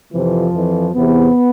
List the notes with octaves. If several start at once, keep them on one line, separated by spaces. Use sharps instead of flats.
F2 C3 E3 F3
F2 E3
E2 C3 E3 B3